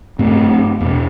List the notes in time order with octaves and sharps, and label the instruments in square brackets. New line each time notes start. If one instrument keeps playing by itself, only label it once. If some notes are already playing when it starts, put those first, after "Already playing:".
[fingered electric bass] G2 A3 C4
E2 B2